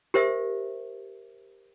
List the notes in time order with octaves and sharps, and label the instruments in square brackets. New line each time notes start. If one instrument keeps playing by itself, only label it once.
[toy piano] G4 A#4 C5 E5